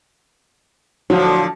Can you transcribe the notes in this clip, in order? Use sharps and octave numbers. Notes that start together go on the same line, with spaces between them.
A2 D3 F3 F#3